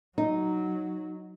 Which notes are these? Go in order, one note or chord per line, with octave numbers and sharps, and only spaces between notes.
F#3 D#4